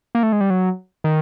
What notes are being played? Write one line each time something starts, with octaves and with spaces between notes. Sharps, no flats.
A#3
A3
G#3
G3
F#3
D#3